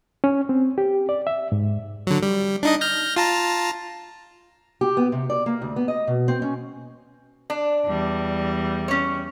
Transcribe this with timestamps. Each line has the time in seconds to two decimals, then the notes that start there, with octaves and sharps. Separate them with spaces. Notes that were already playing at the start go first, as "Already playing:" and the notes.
0.24 C#4
0.49 C4
0.78 G4
1.09 D5
1.27 E5
1.52 G#2
2.07 D3 F#3
2.23 G3
2.63 D4 D#4 D#5
2.81 F6 G6 A#6
3.16 F4 A5 A#5
4.81 G4
4.97 B3
5.12 C3
5.30 D5
5.46 A#3
5.62 D2
5.76 B3
5.88 D#5
6.07 B2
6.28 C4
6.42 C#4
7.50 D4
7.85 E2 G3
8.88 C#4 C#5